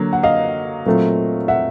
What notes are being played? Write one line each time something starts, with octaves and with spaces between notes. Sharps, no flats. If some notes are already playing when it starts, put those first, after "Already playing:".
Already playing: D3 F#3 A#3
F#5
D#5 F5
A#2 F#3 A3 C4
E5 F#5